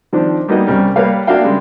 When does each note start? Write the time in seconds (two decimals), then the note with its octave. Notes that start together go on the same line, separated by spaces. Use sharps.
0.13 D#3 F3 C4 D4
0.48 G3 A#3 B3 D#4 F#4 D#5
0.67 C2 G3 C#4 A#4
0.96 G3 A#3 B4 C#5 F5
1.27 A#3 D4 F#4 E5 F5 G5
1.44 C#3 G3 G#3